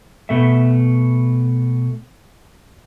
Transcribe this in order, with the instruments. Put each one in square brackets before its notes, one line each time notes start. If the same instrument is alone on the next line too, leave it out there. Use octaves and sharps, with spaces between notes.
[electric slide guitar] B2 A3 E5